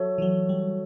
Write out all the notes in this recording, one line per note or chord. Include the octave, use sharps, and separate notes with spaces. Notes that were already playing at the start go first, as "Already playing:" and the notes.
Already playing: F#3 F#4 A4 C#5 E5
E3
F#3
G3